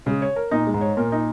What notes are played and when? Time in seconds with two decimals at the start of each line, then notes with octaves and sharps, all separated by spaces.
0.06 C#3 G#3
0.22 C#5
0.36 A#4
0.51 A#2 D#4
0.67 G#3
0.74 G#2
0.81 C#5
0.97 A#2 A#4
1.12 D#4